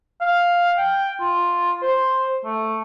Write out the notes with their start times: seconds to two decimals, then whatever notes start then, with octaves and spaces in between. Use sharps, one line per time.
0.21 F5
0.78 G5
1.21 F4
1.82 C5
2.44 A3